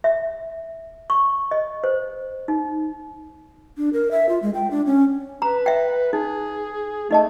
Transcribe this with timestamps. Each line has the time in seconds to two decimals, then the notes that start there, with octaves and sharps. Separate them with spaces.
0.04 E5
1.10 C#6
1.51 D#5
1.84 C5
2.48 D#4
3.78 D4
3.93 A#4
4.11 E5
4.29 F4
4.42 G#3
4.54 G5
4.71 D4
4.86 C#4
5.42 B4 A#5
5.66 E5 G5
6.13 D#4 G#4
7.11 A3 D#4 D#5 A5